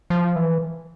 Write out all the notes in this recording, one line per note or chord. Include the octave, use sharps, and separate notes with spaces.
F3
E3